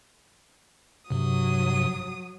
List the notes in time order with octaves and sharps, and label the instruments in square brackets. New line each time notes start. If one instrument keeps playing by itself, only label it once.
[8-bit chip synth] G2 C3 [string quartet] F#3 D#6